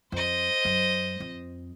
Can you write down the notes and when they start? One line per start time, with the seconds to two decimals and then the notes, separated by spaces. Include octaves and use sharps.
0.12 F2 C5 D#5
0.65 F#2
1.20 F2